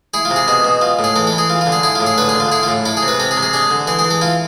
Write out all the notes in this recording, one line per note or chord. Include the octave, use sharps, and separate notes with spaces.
E4 G#4
F4
C3
G#4
B2 G#4
B2
F4
A2
G#4
E3 A4
A4
E3
G#4
F4
F4
D3
G#4
E4 G#4
F4
A2
G#4
D3 B4
G#4
D3
F4
E4 G#4
F4
A2
E4 A4
G#4
C3
B4
C4 A4
G#4
C3
G#4
D4 G#4
D3
E3 G#4
G#4
E3
A4
E4 F4